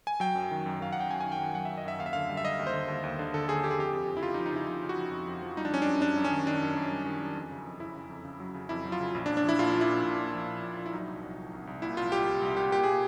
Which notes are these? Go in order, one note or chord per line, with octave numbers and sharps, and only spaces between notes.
G#5
F#3 G5
F#2
D#3
F#2
F#2 F5
F#2 F#5
G5
F#2 G#5
G#5
D#3
G5
D#3
F#3 F#5
E5
F#2
D#5
F#2 E5
D#2 F5
E5
D3 F5
G3
E5
G3 D#5
D#2
C5
D3
D#2
D#2
D3
D3 A4
D#2 G#4
D3 G4
G#4
F2 G4
F2
F2
E4
C#3 F4
D#4
F3
D#4
C#3 E4
F2 F4
C#3
F#4
F3
F2
F2
F3
G3 D#4
D4
G3 C#4
D4
F#2
F#2 D4
F#2
C#4
D#3
D#3 D4
F#2
F#2
G3
D#3
F#2
F2
C#3
F2
C#3 E4
C#3
F2
C#3
F#3
C#3
F2 E4
F#3
F4
C#3
A#1
D4
A#1
D4
F3 E4
A#2 F4
F3
E4
A#2
A#1
A#2
F3
A#1
A#1
A#1
E4
F#3 D#4
C2
C2
C2
C2
C2
A#2 E4
C2 F4
C2 G4
C2
C2
C2 G4
A#2 G4
A#2 G#4